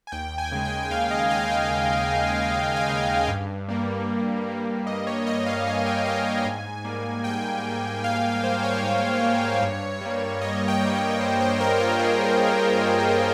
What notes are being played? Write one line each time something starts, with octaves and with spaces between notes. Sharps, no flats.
G#5
D#2 G5
G#5
C#3 G#3
G5
G5
D#2 F5
D#5
C#3 G#3 F5
G5
D#2
C#3 G#3
D#2
G#5
C#3 G#3
G2
G3 A#3
G2
G3 A#3
G2 D#5
C#5
G3 A#3 D#5
F5
G2 G#5
G5
G3 A#3 F5
G#5
G#2
G3 A#3
G#2 G5
G3 A#3
G#2 F5
G3 A#3 C5
C#5
G#2
G3 A#3
G2
G3 A#3
G2 D#5
G5
G3 A#3
C#5
G2 C5
C5
G3 A#3 A#4
F4
G2 G#4